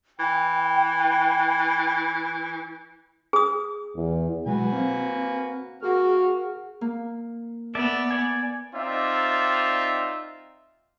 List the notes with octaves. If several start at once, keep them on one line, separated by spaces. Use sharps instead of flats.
E3 G5
G#4 D#6
E2
B2 F#3 G#3 F#4 B4 G#5
A#3 C4
A#3 F#4 G#4 F#5 F6
A#3
B3 D5 E5 A5
D5 G#5
C4 D#4 F4 D5 E5